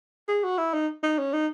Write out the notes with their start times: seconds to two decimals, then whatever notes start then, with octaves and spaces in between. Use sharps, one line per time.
0.28 G#4
0.43 F#4
0.58 E4
0.74 D#4
1.03 D#4
1.19 C#4
1.33 D#4